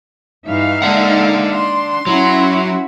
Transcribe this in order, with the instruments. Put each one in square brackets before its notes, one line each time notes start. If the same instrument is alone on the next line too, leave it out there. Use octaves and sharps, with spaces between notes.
[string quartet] G2 E3 [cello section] D#4 E5 F5
[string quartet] G#3 A#3 A4 [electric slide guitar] D4 F#5
[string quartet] C6
[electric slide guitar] F#3 [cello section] C#4 E4 F#4